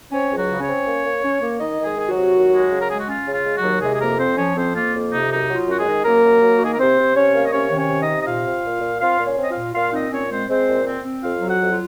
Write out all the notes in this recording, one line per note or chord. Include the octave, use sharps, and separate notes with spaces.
C4 C#4 C#5
C#2
F#3 F#4
C#3
C#4 C#5
C4
A#3
A#3
C#4
A#3
D#3 D#4 D#5
D#3
G#3 G#4
D#3 G#4
F#3 F#4
C3
D#2
G#3
C#3
A#4
G#3 G#4
F#4
C#4 F4
C#3
F4
G#3
F#3 F#4
D#2
C3 G#3 G#4
G#4
F2 A#3 A#4
F3 C4 C5
F3 C#4 C#5
F2 C4 C5
A#3 F4
F2
C3 D#4
F#2 D#4
F#3
F4
F#2 F#4
G#3 G#4
D#3
F#2 A#3 A#4
F#2
F#3
F#4
D#3 G#4
A#4
C3 C4 C5
C3
C3 C#4 C#5
A#3 F5
D#5
C3 C#4 C#5
D#3
C#4 C#5
C3
D#4 D#5
C3
D#5
A#2 F4 F5
C4
A#2
A#2
C4 F4 F5
A#2
C#4 C#5
C4
D#5
F4 F5
A#2
A#2 F4 F5
C4 D#4 D#5
A#2 C#4 C#5
G#3 C4 C5
G#3 C4 C5
A#2
C4
C4
F2 F4 F5
F#3
F#4 F#5
F2
F4